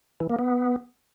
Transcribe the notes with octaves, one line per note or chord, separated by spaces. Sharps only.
E3
A#3
B3